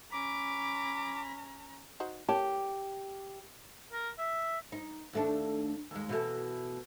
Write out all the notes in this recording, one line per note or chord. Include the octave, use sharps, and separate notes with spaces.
C#4 A#5 B5 D6
D#4 F#4 C5
G4 A#4 C#5 A5
A#4
E5
D#4
D#2 A3 D4
D#2 G#3
B2 E3 A3